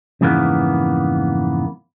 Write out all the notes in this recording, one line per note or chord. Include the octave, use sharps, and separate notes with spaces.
F2 G#2 C#3 E3 A#3 B3